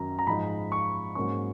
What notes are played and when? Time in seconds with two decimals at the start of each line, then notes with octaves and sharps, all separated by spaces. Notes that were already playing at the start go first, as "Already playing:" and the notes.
Already playing: F#2 D#3 F#3 C#4 A#5
0.19 A#5
0.27 G#2 F3 G#3 D#4 B5
0.72 C#6
1.15 G#2 F#3 A#3 C#4 C#6